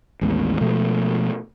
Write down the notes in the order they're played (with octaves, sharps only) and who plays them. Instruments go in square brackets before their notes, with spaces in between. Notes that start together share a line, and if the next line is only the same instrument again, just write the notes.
[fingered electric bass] A1 D#2 G#3 B3
B2 F3 G#3 A3